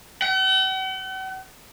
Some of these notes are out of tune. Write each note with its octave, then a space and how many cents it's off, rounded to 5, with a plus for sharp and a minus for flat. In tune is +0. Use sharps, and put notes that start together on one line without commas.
F#5 +45